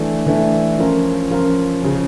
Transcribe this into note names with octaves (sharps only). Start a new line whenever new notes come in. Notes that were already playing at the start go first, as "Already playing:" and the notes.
Already playing: E3 A3 D4
E3 A3 D4
F3 C#4 F4 A#4
F3 C#4 F4 A#4
C#3 F3 C#4